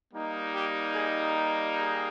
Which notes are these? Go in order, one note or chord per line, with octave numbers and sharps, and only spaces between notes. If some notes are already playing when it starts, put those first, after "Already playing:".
G3 A#3 D#4
G4
G#4
G4
G#4